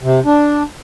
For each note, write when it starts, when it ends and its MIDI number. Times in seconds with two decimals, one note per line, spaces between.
0.01 0.20 48
0.25 0.63 62